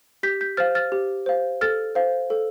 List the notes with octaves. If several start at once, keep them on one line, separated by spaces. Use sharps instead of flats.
G4 G6 B6
G6 B6
C5 F5 F6 A6
F6 A6
G4
C5 F5
A4 F6 A6
C5 F5
A4